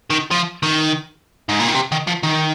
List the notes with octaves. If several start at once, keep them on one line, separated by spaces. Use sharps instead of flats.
D#3
F3
D#3
G#2
A#2
D#3
C3
D#3
F3
D#3